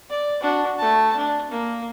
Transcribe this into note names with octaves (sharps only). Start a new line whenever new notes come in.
D5
D4 F#4
A3 A5
D4
A#3